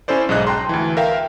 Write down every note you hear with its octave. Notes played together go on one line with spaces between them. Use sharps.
C#4 E4 A4 C5 D5
B1 G#2 G#4 D#5 F#6
G5 A5 A#5 C6
D2 E3
A#4 E5 F5 G5